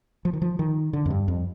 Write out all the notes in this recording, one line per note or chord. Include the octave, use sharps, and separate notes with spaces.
F3
D#3
F3
D#3
D3
F2
G2
F2